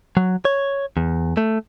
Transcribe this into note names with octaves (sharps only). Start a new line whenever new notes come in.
F#3
C#5
E2
A3